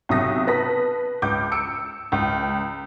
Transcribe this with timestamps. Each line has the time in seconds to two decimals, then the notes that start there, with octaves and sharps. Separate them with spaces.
0.09 B1 C3 E5 D#6 A#6
0.47 B4 A5 A#6 B6
1.22 C#2 D6 G6
1.52 E6 C#7 D7
2.12 C#2